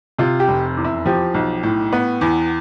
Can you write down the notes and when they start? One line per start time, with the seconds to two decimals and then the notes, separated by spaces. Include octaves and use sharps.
0.18 C3 F4
0.40 G4
0.48 F1
0.77 E2
0.84 E4
1.05 F3 G4
1.34 B1
1.63 A2
1.92 B3
2.21 E2